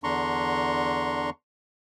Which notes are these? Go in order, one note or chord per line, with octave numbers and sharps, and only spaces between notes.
E2 D3 D4 A#5 C6 C#6